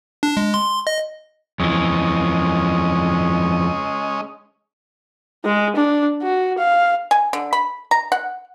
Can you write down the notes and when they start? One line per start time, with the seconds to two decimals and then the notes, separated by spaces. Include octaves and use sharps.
0.23 D4
0.37 G#3
0.54 C6
0.87 D#5
1.60 F2 E3 G#3 C#4 D#5
5.45 G#3
5.76 D4
6.23 F#4
6.58 F5
7.11 G#5
7.33 D3
7.53 B5
7.91 A#5
8.12 F#5